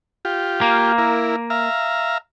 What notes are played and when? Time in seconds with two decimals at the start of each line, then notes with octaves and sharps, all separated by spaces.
0.25 F4 G4
0.61 A#3
0.98 E4 A#4
1.50 E5 F5 A#5